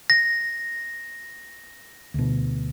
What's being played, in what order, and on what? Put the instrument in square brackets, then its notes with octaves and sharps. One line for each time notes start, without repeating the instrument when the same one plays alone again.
[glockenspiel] A#6
[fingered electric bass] D2 B2